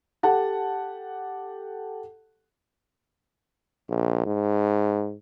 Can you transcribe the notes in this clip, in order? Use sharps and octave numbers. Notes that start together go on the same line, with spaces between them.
G4 A4 F#5 A5
A#1
G#2